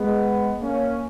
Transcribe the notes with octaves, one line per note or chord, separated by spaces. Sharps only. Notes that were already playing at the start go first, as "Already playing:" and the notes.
Already playing: G#3 B3
A#3 C#4